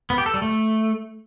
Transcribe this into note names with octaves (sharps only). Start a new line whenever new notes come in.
B3
G4
A4
G3
A3